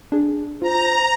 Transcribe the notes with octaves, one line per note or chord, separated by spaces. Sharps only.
D4 G#4
F4 C5 A#5